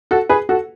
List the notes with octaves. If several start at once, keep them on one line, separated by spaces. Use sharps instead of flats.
F#4 A4
G#4 B4
F#4 A4